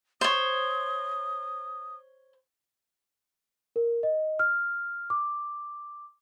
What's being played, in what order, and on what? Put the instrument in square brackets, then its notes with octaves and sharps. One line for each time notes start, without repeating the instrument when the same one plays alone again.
[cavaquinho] C5 C#5 [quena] D#6
[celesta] A#4
D#5
F6
D6